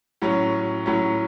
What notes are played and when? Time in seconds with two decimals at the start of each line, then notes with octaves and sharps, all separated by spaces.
0.22 A2 F#3 C#4
0.86 A2 F#3 C#4